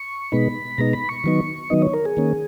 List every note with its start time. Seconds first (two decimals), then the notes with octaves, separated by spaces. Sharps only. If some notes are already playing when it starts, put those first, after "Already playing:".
Already playing: C#6
0.32 B2 G#3 B3 D#4 B5
0.78 B2 G#3 B3 D#4 A#5
0.93 B5
1.09 C#6
1.24 D#3 F#3 B3 D#4
1.70 D#3 F#3 B3 D#4 D#5
1.82 C#5
1.94 A#4
2.05 G#4
2.17 D#3 A#3 C#4